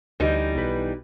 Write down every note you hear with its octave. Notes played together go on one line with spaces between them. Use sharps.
D2 E3 G3 D#4
B1 B4